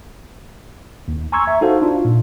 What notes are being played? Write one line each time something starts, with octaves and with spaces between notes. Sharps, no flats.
D#2
G#5 A#5 C6 C#6 E6 G#6
E5
D#4 F#4 A4 C5 F5
D4 F4
A#2